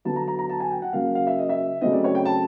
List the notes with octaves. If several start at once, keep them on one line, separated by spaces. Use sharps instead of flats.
D3 F#3 B3 A5
A#5
A#5
A#5
A5
G#5
G5
F#5
C#3 F#3 A#3 F5
F5
E5
D#5
E5
C#3 F#3 A3 C4 D#5
D5
C#5
G5
A5